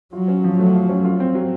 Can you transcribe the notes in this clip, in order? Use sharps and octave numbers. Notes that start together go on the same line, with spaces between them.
F#3 F4
C#4
F3
F#3 A3
F4
C#4
F4
C4
F#3